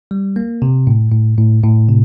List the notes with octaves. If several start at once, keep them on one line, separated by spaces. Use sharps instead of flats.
G3
A#3
C3
A2
A2
A2
A2
C3